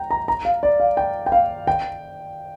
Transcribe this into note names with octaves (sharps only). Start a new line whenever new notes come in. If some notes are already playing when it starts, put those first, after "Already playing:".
Already playing: G5 A#5
A#5
A#5
F5
D5
F5
G5
G5
F5
G5